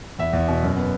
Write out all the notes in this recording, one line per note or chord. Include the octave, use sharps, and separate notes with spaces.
E2 E5
E2
B2
F#2
B3